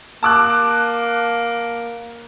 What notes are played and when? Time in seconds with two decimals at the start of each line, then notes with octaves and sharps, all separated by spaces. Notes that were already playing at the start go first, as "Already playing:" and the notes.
0.23 A#3 A5 D6 F#6